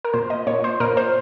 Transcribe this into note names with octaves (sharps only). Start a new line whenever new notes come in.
A#4
A#2 C5
D#5
A#2 C#5
C5
A#2 A#4
C5